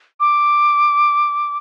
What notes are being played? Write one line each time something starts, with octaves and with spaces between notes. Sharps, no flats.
D6